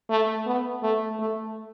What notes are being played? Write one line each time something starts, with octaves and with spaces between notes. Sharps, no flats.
A3
B3
A3
A3